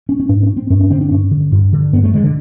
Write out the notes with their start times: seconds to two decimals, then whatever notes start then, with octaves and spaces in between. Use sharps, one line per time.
0.09 C#4
0.20 C#4
0.29 G#2 D4
0.43 C#4
0.57 C4
0.70 G2 C#4
0.81 C#4
0.90 D3 C4
1.01 D4
1.11 G2 C#4
1.31 D3
1.52 G2
1.73 D3
1.93 G2 B3
2.03 A3
2.14 D3 G#3
2.24 D3